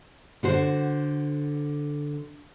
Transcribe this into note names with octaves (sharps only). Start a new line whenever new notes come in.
D3 F#4 C5